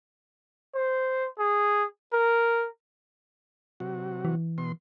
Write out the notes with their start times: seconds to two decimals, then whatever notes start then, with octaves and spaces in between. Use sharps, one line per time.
0.75 C5
1.38 G#4
2.13 A#4
3.80 C3 F#3 F#4
4.25 E3
4.58 B2 C6